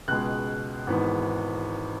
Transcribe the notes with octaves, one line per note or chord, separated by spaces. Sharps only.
C#2 B2 G#3 F#6
G#1 G#2 E3 B3